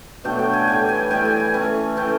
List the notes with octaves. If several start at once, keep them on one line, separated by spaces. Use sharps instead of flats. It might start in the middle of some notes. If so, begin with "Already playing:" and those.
B2 F#3 A3 D4 G5
G5
G#5
A2 E3 G3 G5
G#5
A2 E3 G3 G5
G#5
G#5
E3 A3 C#4
E3 A3 C#4 G5